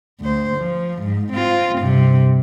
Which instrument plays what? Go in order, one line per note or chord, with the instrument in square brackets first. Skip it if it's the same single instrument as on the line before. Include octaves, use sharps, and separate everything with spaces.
[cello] D2 C5
F3
G#2
C4 F4
G2 C3